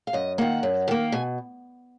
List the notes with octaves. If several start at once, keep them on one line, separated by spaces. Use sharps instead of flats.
F5
F#2 D#5
D#3 A#3 F#5
F#2
D#3 A#3
B2 G#5